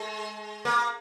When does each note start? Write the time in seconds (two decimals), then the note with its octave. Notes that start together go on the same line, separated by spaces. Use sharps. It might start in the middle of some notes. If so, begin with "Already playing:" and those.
Already playing: G#3
0.65 A#3